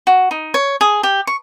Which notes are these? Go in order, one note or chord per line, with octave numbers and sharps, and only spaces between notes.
F#4
D#4
C#5
G#4
G4
C#6